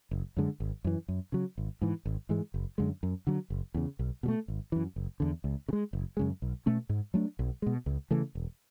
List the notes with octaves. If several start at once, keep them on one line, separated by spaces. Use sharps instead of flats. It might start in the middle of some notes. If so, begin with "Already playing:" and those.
F#1
F#2 D3 G#3
G#1
F#2 E3
F#2
C#3 F#3
G#1
G#2 E3
G#1
G#2 E3 G#3
F#1
F#2 D3 G#3
F#2
D3 F#3
F#1
E2 C#3
B1
B2 F#3 A3
G#1
F#2 E3
F#1
E2 D3
C#2
C#3
G#3
F#1
F#2 C#3 G#3
B1
B2 A3 C#4
G#2
F#3 A3 D4
B1
B2 G#3
C#2
C#3 E3 A3
E1